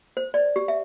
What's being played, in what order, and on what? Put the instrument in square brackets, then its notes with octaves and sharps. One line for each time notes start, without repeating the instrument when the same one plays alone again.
[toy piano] C5
D5
G4
E5